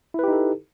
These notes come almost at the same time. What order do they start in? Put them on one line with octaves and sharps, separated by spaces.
E4 B4 G4 D#4 A4